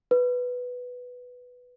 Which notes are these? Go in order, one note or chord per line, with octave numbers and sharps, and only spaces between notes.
B4